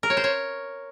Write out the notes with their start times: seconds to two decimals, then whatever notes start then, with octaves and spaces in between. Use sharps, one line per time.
0.03 A#4
0.10 C#5
0.17 C5
0.24 C#5